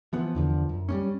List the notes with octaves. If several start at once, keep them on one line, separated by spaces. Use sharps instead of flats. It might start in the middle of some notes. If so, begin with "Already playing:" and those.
E3 F3 B3
E2 D3 F3
F#2
G3 A#3 C#4